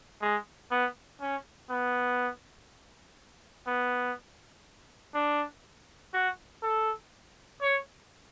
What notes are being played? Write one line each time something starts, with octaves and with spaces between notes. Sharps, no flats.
G#3
B3
C#4
B3
B3
D4
F#4
A4
C#5